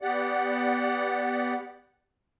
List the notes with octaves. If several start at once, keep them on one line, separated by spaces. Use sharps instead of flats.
B3 G4 D5 F#5